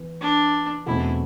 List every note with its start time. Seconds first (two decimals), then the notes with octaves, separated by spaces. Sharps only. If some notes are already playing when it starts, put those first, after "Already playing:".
Already playing: E3 B3 E4
0.21 D4
0.86 E2 B2 A3 C4 E4